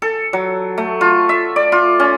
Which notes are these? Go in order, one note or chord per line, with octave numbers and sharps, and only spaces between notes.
A4
F#3
A3
F4
E5
D5
F4
C#4